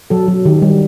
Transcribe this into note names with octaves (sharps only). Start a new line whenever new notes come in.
F#3 A4
F#3
D#3 G4
G3